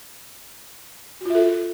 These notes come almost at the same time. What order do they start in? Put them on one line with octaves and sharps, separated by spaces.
F#4 F4 E5 A4